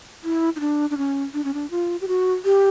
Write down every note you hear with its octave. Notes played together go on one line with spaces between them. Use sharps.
E4
D#4
D4
D4
C#4
D4
C#4
D4
F4
G4
F#4
G4